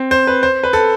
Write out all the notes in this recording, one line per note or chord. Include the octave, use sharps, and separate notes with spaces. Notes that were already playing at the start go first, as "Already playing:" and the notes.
Already playing: C4
C5
B4
C5
B4
A4